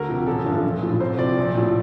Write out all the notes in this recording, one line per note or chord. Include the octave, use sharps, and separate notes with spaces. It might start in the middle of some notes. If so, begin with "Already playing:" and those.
Already playing: D2 A#4
C3 F3
A1 A4
G2 D3 F3
A#1
A2 F3
C2 C5
C3 F3 D5
A#1
A2 F3